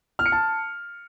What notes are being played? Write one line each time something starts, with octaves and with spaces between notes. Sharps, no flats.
F6
C#7
A5